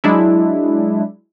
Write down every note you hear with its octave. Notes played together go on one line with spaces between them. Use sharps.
F#3 G#3 D4 E4